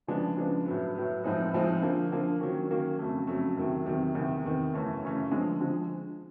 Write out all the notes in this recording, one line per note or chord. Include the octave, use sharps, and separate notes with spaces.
C#3 F3 G#3 B3 D4
C#3 F3 G#3 B3 D4
A2 F#3 B3
A2 F#3 B3
A2 F3 G#3 C4 D#4
A2 F3 G#3 C4 D#4
D3 F3 A#3
D3 F3 A#3
D#3 F#3 A#3 C#4
D#3 F#3 A#3 C#4
F2 C#3 F#3 A3
F2 C#3 F#3 A3
E2 C3 D#3 F#3
E2 C3 D#3 F#3
E2 C3 D#3
E2 C3 D#3
F#2 C#3 E3 A3 C#4
F#2 C#3 E3 A3 C#4
D3 F3 G#3
D3 F3 G#3